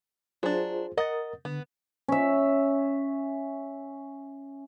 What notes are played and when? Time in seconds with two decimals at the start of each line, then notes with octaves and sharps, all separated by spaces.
0.43 F#3 D4 F4 G#4 C5
0.97 A#4 D#5 F#5 D#6 A6
1.45 D3 B3
2.08 C#4 E5